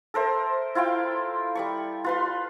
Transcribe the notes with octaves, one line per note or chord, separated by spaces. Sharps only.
A4 A#4 C5 E5
E4 F4 F5 G5
G3 B5 C#6
F4 B4 C6